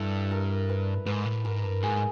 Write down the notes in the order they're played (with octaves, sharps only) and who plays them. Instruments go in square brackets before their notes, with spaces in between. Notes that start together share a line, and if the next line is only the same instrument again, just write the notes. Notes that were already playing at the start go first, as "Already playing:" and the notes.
Already playing: [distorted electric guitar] G2 [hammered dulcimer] E4 A4
[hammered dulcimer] A#4
B4
[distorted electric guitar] G#2 [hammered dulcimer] B4
[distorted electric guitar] A2
[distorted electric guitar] G#2 [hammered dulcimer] A#4
[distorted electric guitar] G2
[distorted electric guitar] G#2 [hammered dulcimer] G#4